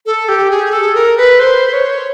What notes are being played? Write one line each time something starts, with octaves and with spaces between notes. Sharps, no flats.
A4
G4
G#4
A4
A#4
B4
C5
C#5